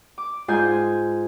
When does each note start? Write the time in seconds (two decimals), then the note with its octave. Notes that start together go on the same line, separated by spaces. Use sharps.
0.18 D6
0.48 G#2 F4 G#5 D#6 G6